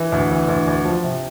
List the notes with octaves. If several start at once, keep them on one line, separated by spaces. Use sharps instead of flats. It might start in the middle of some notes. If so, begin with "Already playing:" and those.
Already playing: E3
D2
E3
D2
D2
F3
C3